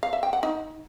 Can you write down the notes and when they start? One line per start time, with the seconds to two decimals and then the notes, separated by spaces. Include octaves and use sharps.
0.03 F5
0.13 E5
0.23 G5
0.33 F#5
0.43 D#4